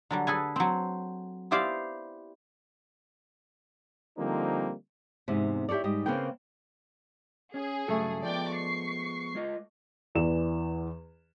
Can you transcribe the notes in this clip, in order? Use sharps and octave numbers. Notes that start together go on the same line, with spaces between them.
D3 F#3 G3
G#4 A4 B4 G#5
F#3 C4
B3 E4 G4 C5 D5 F5
D3 F3 G3 A#3 C4 D#4
E2 G#2 C3
E4 G4 A4 C#5 D5
G#2 G3 G4 D#5
C#3 A#3 C4 G#4 B4 G5
C#4 G#4
G2 C#3 F#3 A3 A4
F3 G#3 B3 D5 G5 D6
C#6 C7
G#3 F4 D#5
E2 E3 D5 E7